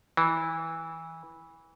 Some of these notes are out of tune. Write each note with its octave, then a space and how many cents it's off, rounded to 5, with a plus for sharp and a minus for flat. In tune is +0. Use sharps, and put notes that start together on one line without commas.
E3 -15